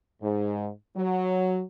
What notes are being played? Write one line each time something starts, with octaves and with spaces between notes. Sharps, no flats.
G#2
F#3